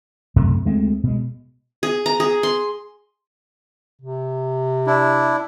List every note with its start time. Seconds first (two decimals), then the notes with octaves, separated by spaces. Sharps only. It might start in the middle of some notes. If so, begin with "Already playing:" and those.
0.36 B1 F#2 C3 A3
0.65 D2 G#3 A3 C4
1.03 B2 G#3
1.83 G#4
2.06 A#5
2.20 G#4
2.43 C6
4.02 C3
4.86 D4 E4